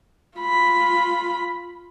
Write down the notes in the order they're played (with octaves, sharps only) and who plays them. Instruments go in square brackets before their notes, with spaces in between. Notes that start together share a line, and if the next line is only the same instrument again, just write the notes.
[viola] F4 B5